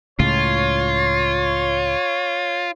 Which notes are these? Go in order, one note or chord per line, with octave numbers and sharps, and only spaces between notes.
C#2 A2 C#3 F4 C#5